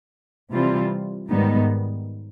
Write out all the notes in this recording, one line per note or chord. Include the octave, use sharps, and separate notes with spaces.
C3 E3 G3 C4 F4
G#2 D#3 G3 B3 D#4